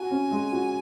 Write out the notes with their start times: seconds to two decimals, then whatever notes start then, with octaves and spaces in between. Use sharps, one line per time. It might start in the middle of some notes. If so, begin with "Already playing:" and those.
Already playing: F#4 G#5
0.11 C#4
0.31 G#3
0.52 F#4